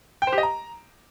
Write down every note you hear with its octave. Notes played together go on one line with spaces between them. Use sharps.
G5
C5
G4
D#5
A#5